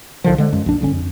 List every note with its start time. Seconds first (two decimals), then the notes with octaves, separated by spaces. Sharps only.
0.24 B1 D3 D#3 F3
0.38 D3 G#3
0.53 F#2 G#3
0.66 A#1 D4
0.80 D1 G1 D3 C#4
0.93 F2